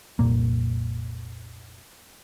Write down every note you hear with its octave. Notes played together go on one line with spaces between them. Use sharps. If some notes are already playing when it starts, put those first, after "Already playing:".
F1 C2 A#2 A#3